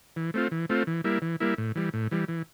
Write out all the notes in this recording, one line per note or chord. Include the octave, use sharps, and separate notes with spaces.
E3
A3 C4 F4
E3
A3 C4 F4
E3
G3 A#3 E4
E3
G3 A#3 E4
A2
E3 G3
A2
E3 G3
E3